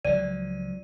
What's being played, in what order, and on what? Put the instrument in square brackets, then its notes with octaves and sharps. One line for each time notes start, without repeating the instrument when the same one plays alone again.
[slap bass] C#2 F3 F#3 [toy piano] D5 [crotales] D#7